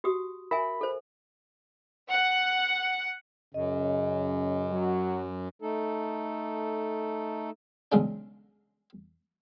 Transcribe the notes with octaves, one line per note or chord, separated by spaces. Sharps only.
F#4 G4 D#6
A#4 E5 G#5 B5
A4 C5
F#5
F#2 C#3 D#5
F#3 F#4
A3 D#4 A4
B1 C#3 G#3 D4